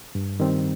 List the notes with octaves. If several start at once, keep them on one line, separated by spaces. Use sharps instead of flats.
G2
D#3 G3 C4